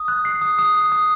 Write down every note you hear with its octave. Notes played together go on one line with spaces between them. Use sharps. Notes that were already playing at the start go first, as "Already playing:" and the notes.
Already playing: D#6
F#6
C7
D#6
D#6
D#6
D#6